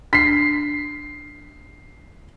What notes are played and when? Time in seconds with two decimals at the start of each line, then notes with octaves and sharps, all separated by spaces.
0.13 D4 B6 C7